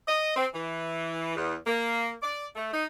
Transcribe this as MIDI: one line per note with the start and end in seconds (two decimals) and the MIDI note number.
0.08 0.36 75
0.36 0.47 60
0.54 1.35 52
1.35 1.55 40
1.67 2.12 58
2.22 2.46 74
2.56 2.69 57
2.72 2.85 63